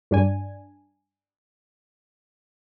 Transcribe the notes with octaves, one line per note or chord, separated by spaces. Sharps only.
G2 D4 G#5